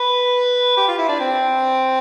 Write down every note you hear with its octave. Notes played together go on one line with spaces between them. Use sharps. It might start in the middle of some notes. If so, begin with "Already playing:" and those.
Already playing: B4
G4
F4
E4
D4
C4